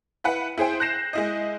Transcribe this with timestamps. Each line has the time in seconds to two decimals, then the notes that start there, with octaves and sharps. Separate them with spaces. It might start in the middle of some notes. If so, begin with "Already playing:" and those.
0.24 E4 B4 F#5
0.58 E4 G#4 C5 G5
0.80 F#6 G6 A#6 C7 E7
1.13 G#3 E4 D#5